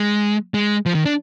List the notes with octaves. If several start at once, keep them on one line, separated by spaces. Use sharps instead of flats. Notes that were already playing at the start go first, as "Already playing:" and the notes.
Already playing: G#3
G#3
F3
D#3
D4